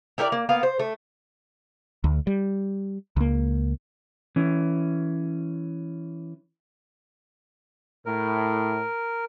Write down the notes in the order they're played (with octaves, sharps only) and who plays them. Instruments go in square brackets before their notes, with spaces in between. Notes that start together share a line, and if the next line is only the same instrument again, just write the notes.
[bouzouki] E4 G4 A#4 D5
A#3
A#3 B3 F5
C5
A3
[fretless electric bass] D2
G3
C#2 A#3
[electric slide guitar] E3 C#4
[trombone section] A2 [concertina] A#4